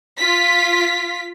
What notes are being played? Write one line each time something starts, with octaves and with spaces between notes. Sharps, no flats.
F4 B6